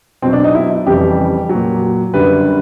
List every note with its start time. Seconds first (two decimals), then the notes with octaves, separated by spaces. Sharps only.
0.22 B2 F#3 C4
0.33 D4
0.44 D#4
0.55 E4
0.86 F2 C#3 E3 G3 G4
1.49 F#3
1.55 A#2
2.13 F#2 D3 G3 B4